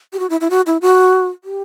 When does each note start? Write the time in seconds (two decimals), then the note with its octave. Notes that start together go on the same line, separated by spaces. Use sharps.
0.13 G4
0.19 F#4
0.30 E4
0.40 E4
0.50 F#4
0.66 E4
0.82 F#4
1.44 G4